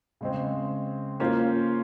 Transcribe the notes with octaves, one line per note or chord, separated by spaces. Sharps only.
C#3 G#3 C4
A#3 C#4 F4 C5